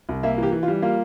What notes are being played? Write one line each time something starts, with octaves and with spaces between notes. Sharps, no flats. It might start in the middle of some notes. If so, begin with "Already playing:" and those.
C2
A#3 E5
E3 G4
E3
F4
G3
A#3 F4